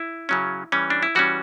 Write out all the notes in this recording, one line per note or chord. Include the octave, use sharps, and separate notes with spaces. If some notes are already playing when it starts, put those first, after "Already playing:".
Already playing: E4
C#3 F#3 C#4
E3 G3 C#4
D4
E4
E3 G3 C#4 F#4